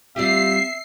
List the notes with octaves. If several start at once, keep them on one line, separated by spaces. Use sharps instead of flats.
G3 C4 F4 G4 E5 C7